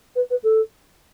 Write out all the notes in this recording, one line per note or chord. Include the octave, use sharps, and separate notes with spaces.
B4
B4
A4